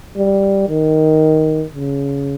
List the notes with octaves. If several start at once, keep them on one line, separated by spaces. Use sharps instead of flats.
G3
D#3
C#3